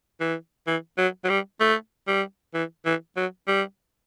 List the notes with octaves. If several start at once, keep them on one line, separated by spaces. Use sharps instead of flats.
E3
E3
F#3
F#3
G3
A3
G3
E3
E3
F#3
G3